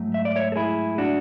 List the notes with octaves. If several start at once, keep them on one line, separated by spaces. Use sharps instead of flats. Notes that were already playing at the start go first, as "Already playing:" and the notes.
Already playing: G#2 F#3 A3
E5
D5
C#5 E5
A4
E4 G#4
D4 F#4